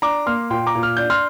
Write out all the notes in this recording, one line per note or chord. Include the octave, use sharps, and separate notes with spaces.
D4 A#5 D6
A#3 C6 F6
A#2 G5 C6
A#5 D6
A#2
F6
D4 G6
C6 F6